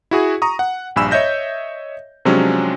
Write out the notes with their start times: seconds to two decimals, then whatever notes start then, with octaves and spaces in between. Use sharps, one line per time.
0.11 E4 F#4 G#4
0.42 A#5 C#6 D#6
0.59 F#5
0.96 A#1 G2 G#5 B5 E6 E7
1.11 C#5 D#5 E5 G6 A#6
2.25 C3 F3 F#3 G#3 C#4 D4